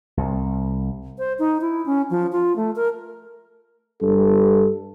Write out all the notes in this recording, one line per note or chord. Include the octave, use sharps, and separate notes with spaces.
C2
C5
D#4
E4
C#4
F3
F4
A3
A#4
G2 A4